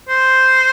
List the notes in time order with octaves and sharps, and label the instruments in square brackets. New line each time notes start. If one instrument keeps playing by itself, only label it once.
[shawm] C5